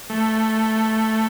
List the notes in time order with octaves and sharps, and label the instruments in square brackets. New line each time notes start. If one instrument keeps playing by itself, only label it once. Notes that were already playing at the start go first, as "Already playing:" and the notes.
[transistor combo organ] A3